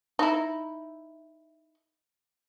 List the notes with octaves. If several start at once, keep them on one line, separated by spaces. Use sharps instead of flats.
D#4 E4